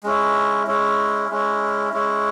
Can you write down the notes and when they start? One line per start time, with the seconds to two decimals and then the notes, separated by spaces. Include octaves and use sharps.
0.04 G#3 C#4 E4
0.67 G#3 C#4 E4
1.29 G#3 C#4 E4
1.92 G#3 C#4 E4